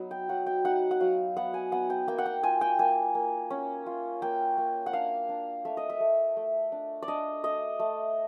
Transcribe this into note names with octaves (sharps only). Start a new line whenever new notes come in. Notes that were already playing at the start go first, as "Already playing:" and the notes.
Already playing: F#3 B3 D#4
G5
F#3 F#5
G5
D#4 F#5
F#5
F#3 F5
B3 F#5
G#5
B3 F#5
G5
A#3 G5
F#5
G5
F4 G#5
G5
A#3 G#5
A#3
C#4
F4
A#3 G5
A#3
F#5
D4 F5
D4
A3 E5
D#5
E5
A3
A3
D4
D5
D4 D#5
A3 D#5
A3